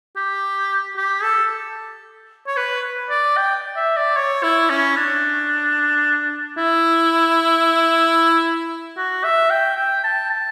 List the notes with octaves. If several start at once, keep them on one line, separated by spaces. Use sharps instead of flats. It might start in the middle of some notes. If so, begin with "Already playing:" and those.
G4
G4
A4
C#5
B4
D5
G5
E5
D5
C#5
E4
C#4
D4
E4
F#4
E5
G5
G5
A5
A5